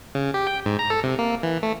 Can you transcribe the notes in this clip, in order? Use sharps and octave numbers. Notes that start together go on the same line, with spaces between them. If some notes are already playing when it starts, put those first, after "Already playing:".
C#3
G4
G5
G#2
A#5
A4
C3
A#3
E3
A3